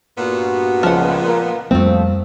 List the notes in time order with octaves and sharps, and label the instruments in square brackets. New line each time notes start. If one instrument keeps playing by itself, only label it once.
[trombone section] G2 F#4 [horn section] A#2 B3
[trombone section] C#2 [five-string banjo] F3 F#5
[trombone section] F4 A#4
[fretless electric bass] F2 G3 A#3 [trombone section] F3 [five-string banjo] A3 C4